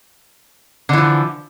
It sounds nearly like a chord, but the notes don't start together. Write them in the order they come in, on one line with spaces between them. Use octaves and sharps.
D3 E3 F3